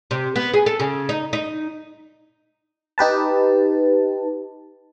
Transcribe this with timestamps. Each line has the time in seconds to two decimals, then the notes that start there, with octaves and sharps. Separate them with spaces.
0.11 C3
0.36 B3
0.54 G#4
0.66 A4
0.80 C#3
1.09 D#4
1.33 D#4
2.98 D#4 G4 B4 A5